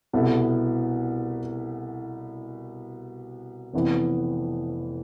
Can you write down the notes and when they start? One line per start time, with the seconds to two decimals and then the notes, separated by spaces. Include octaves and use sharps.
0.13 C2 B2 B3 E4 A4
3.74 F1 F2 E3 B3 E4